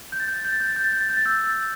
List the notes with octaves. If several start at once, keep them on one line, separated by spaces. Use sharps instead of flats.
G6
A6
G6
A6
G6
A6
G6
A6
G6
A6
G6
A6
G6
A6
E6 G6